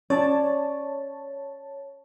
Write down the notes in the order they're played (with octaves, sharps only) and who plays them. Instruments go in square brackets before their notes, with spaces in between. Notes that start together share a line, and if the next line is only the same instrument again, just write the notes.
[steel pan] C#4 [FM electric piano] C#5 A5 [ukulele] D5